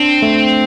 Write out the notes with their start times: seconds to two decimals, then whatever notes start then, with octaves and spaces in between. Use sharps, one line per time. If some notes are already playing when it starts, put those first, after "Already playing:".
Already playing: C4 D4
0.22 A3